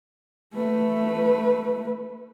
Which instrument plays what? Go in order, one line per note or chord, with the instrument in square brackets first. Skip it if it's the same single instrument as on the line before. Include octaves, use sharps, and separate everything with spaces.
[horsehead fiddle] A3 B4